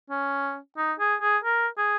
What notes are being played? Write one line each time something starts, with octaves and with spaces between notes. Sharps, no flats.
C#4
D#4
G#4
G#4
A#4
G#4